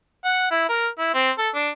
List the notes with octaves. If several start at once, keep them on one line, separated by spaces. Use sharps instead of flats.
F#5
E4
A#4
E4
C4
A4
D4